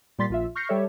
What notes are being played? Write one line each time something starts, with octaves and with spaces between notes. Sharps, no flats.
A#2 G3 C6 A6 B6
A#1 F4 E5
C#6 F6 G6 A#6 C7 C#7
G3 G4 A4 C#5 E5